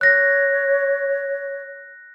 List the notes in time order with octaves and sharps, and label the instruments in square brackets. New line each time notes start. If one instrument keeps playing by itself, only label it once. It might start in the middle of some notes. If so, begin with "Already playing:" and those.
[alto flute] C#5 [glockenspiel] F#6 A#6